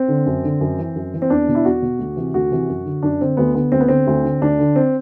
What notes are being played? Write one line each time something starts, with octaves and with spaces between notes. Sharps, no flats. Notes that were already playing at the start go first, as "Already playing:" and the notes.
Already playing: C4
D3
F#2
D3
F#2
E3
F#2
E3
C4
E2 D4
B2
E4
E2 F#4
B2
D2
C3 E3
D2 F#4
C3 E3
F#2
D3
F#2 D4
D3 C4
D2 B3
D3 B3
D2 C4
B3
D3 C4
D2
D3
D2 D4
D3
C4